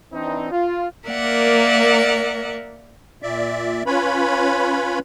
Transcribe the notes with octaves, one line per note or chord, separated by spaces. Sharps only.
E3 C4 D4 D#4
F4
A#3 A#4 D5 E5 F#5
A#2 D5 E5
C#4 F4 B4 C#5 B5